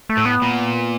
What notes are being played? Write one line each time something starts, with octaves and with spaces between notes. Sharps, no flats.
A3
A2
B3
A#2